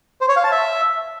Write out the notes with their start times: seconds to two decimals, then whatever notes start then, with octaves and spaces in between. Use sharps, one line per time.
0.21 C5
0.29 C#5
0.36 F5
0.44 A5
0.52 E5